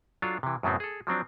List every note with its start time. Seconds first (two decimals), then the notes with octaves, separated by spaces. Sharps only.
0.22 F#3 D4 F4 A4 F5
0.43 C3 E3
0.63 F#2 A2 C#3 F#3 B3 C4
0.80 G#4 A4
1.07 F3 F#3 C4 D4